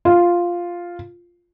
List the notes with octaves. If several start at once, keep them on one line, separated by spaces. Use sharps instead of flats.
F4